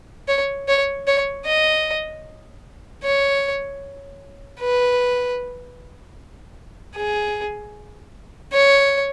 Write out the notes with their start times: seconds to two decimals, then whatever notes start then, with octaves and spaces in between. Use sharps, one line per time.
0.28 C#5
0.68 C#5
1.07 C#5
1.46 D#5
3.04 C#5
4.61 B4
6.96 G#4
8.53 C#5